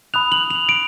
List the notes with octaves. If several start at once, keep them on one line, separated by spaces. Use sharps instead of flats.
B5 D#6 F#6 F7
F#7
F7
D7